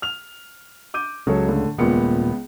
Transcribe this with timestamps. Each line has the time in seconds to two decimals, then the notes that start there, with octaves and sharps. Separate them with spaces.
0.02 F6 F7
0.94 D6 G6 D#7
1.27 C#2 C#3 F#3 A4 C#5
1.47 A2 D3
1.78 D#1 C#2 A#2 B3 C#7